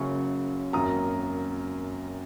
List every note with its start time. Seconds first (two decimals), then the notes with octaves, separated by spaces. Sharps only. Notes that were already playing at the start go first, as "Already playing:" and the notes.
Already playing: F#1 F#2 C#3 F#3 C#6
0.73 G#1 F#2 F#3 A#3 A#5 D#6